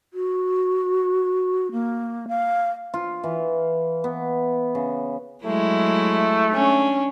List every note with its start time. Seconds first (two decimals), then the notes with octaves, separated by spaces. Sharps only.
0.14 F#4
1.72 A#3
2.28 F5
2.94 F4
3.24 E3
4.04 B3
4.75 C#3
5.44 F#3 G#3 A3 E4
6.54 C#4 D4